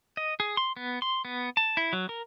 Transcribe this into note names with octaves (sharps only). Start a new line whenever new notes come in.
D#5
G#4
C6
B3
C6
B3
A5
E4
F#3
A#4